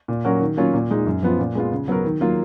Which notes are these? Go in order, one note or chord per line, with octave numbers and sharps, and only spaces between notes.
A#2
F#3 C#4 F#4 A#4
D#3
F#3 A#3 C#4 F4
A#2
G#3 D#4
F#2
F3 B3 F4
A#2
G#3 B3 F4
C#3
F#3 B3 F#4 A#4
D#3
F#3 A#3 F4